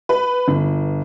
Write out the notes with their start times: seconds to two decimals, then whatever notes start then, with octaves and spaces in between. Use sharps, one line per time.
0.09 B4
0.48 G1